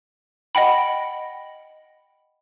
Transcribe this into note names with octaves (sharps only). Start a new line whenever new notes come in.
D#5 F#5 G5 B5